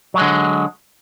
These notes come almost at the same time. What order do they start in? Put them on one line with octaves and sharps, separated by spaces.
F#3 G#3 D3